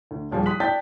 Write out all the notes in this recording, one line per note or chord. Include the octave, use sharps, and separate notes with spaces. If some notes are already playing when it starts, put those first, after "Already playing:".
D2
D#1 F3 G3 G#4
C6 D#6 F#6 B6 F#7
D5 G5 A5 G6 A6 B6